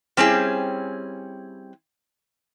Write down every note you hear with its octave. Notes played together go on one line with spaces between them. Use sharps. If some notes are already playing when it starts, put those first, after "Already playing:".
G3 C4 C#4 E4 G#4